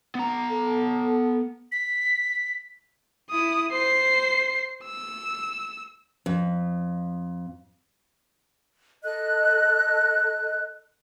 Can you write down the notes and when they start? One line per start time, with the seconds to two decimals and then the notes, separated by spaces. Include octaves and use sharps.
0.15 B3 A#5
0.50 A4
1.72 B6
3.31 E4 D#6
3.72 C5 C7
4.85 E6
6.26 F2
9.03 A4 D#5 F#6